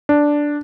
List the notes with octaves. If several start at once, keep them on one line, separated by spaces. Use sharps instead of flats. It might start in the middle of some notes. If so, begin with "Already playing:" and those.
D4